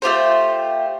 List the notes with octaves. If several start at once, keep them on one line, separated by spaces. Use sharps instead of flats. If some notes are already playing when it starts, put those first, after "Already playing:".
A3 F4 G4 C5